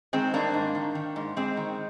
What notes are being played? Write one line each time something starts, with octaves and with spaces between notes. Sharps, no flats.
D#3 G#3 C4
G2 A#3 D4
G#2
D#3
D#3
G#2
G#2 G#3 C4
D#3